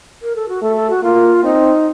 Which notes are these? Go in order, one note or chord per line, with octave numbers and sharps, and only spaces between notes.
A#4
A4
F#4
A3 A4
A4
F#4
A#3 F4
C4 D#4